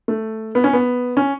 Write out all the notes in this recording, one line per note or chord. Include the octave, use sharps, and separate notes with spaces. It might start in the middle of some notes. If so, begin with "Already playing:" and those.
A3
B3
C#4
B3
C#4